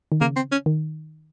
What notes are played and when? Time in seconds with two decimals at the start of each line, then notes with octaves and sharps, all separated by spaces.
0.12 D#3
0.21 C#3 A#3
0.36 C4
0.52 C#4
0.66 D#3